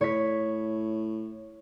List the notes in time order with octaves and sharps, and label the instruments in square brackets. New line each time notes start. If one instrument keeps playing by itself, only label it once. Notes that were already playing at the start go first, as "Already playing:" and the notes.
[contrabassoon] A2 [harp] C#5 B6